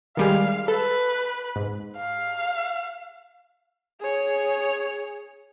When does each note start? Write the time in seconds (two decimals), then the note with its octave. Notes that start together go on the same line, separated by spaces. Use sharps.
0.17 D#3 G3 G#3 F5
0.68 A4 B4
1.56 G#2
1.96 F5
4.00 G#4 C#5